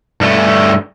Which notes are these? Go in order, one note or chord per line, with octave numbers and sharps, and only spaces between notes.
G2 A3